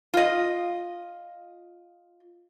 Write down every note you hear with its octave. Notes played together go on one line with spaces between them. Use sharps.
F4 D#5